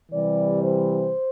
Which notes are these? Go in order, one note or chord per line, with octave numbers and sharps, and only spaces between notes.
C3 E3 G3 D5
C5